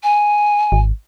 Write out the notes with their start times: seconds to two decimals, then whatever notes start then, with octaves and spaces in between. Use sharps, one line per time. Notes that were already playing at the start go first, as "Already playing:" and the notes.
0.03 G#5
0.72 G#1